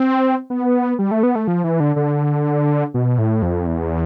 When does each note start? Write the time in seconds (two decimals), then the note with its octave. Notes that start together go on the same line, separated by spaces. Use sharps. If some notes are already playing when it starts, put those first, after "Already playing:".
Already playing: C4
0.50 B3
0.99 G3
1.11 A3
1.23 B3
1.35 A3
1.48 F3
1.64 E3
1.80 D3
1.96 D3
2.94 B2
3.18 A2
3.42 F2
3.66 E2